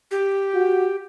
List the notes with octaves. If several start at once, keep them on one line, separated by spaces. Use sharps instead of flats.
G4
F#4